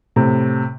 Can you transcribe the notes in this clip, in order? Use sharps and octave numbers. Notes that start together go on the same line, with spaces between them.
A2 C3